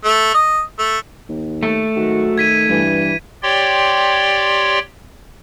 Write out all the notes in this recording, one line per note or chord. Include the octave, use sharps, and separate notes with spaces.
A3
D#5
A3
D#2
A3
G#2 D#3 F#3 F#4
D#3 G#6 B6 D#7
G2 E3
G4 C#5 D5 G5 C6